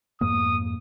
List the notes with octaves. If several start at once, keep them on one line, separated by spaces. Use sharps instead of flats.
F2 G#2 A#3 D#6